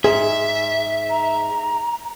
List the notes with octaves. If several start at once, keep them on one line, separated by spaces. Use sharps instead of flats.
G#2 G#4 E5
A#5